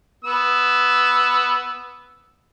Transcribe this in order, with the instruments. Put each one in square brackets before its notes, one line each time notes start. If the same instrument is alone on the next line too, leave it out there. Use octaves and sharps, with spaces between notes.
[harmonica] B3 E6